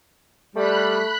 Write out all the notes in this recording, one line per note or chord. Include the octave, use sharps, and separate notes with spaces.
G3 A3 B5 F#6